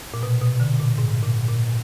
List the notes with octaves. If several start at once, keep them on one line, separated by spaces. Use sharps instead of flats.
A#2
B2
B2
D3
A#2
G#2
A#2
A#2